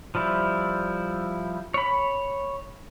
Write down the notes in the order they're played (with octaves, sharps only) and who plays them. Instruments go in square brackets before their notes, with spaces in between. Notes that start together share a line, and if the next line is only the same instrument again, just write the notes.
[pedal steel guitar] F3 G3 E4
C#5 B5